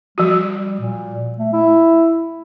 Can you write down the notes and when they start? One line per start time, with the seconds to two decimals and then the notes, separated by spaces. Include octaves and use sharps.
0.18 F3 G3 F#4
0.80 A#2
1.38 A3
1.53 E4